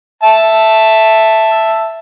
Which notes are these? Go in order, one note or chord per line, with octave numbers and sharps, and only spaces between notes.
E5 A5